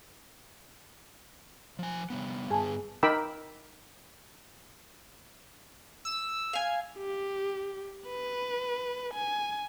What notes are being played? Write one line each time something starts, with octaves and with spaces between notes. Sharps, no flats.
F3 G#5
C3 G3 B3
G2 B3 G#4 G#5 A5
D#4 A#4 G5 B5 D6 E6
E6
F5 G#5
G4
B4
G#5